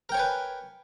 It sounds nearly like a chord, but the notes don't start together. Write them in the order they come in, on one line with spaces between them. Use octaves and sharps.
A#4 G5 C#5 G#5 B4